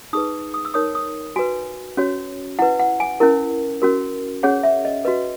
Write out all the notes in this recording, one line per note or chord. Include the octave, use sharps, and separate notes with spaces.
D#4 G#4 B4 D#6
D#6
E6
D#4 A#4 C#5 D#6
D#6
F#4 B4 G#5
C#4 F#4 C#5
E4 B4 F#5
F#5
G#5
C#4 E4 A#4
C#4 F#4 A#4
C#4 G#4 C#5 F#5
E5
D#5
F#4 B4 D#5